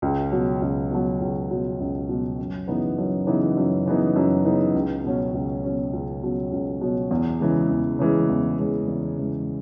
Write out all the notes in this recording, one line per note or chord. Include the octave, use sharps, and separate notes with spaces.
C#2
B2 F#3
C#2
B2 F#3
C#2
B2 F#3
C#2
B2 F#3
F#2
C#3 E3 B3 D#4
F#2
C#3 E3 B3 D#4
F#2
C#3 E3 B3 D#4
F#2
C#3 E3 B3 D#4
C#2
B2 F#3 C#4
C#2
B2 F#3 C#4
C#2
B2 F#3 C#4
C#2
B2 F#3 C#4
E2
C#3 E3 G#3
E2
C#3 E3 G#3
E2
C#3 E3 G#3
E2
C#3 E3 G#3